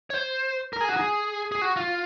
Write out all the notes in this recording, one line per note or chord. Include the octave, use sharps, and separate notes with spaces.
C#5
C5
A#4
G#4
F#4
G#4
G#4
F#4
F4